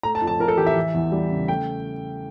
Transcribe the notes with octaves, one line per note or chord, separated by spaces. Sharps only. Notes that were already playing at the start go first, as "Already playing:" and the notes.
A3 A#5
A5
F2
A5
F2 A#4
A4
E3 G4
E5
E3
E2
G3
C#3
A3 G5